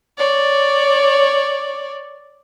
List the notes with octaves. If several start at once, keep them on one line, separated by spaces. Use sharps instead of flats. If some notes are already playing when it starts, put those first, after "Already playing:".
C#5 D5